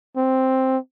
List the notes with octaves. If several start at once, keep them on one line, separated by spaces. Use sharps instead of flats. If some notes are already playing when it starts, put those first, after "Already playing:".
C4